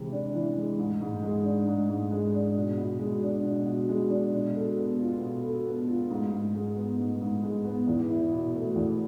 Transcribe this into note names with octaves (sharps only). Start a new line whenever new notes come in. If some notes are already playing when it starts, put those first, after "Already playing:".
Already playing: C3 E3 G#3
D4
E3
G#3
G#2
G#2
G#3
D4
G#2
G#2
G#3
D4
B2
B2
G#3
D4
B2
B2
G#3
D4
B2
A4
B3
F4
B2
A4
B3
F4
G#2
G#2
G#3
B3
G#2
G#2
G#3
B3
E2
E4
B2
A3
E2